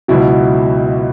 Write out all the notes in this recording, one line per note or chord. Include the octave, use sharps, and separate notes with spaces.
C#2 B2 F#3 E4